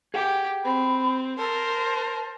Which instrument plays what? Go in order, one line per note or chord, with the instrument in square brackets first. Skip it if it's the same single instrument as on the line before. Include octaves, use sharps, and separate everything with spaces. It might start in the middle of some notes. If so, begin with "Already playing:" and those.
[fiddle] G4 [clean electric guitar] G#4 F#5 G5
[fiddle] C4 [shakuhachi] B5
[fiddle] A#4 [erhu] C5 [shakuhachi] A5